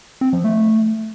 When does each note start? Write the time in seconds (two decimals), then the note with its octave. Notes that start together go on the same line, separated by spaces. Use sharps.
0.21 C4
0.33 F3
0.44 A3